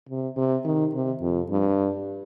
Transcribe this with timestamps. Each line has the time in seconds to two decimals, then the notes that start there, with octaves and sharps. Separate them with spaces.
0.09 C3
0.36 C3
0.65 D#3
0.94 C3
1.21 F2
1.50 G2